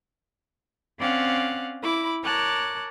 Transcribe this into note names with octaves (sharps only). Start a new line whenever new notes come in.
C4 C#4 D5 F5 F#5
E4 B5 D6
A#4 C#5 A5 D6 F#6